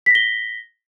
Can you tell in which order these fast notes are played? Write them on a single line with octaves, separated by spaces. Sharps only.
B6 A#6 G7